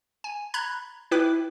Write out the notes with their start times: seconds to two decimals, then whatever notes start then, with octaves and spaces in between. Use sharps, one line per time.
0.24 G#5
0.54 A#5 B5 F#6 G#6
1.11 E4 B4 G5 D6